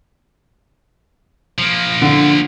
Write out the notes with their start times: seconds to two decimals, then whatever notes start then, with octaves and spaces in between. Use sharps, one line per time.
1.59 F3 A#3
2.02 D3